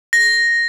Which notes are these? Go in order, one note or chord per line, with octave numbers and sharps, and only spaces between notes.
A#6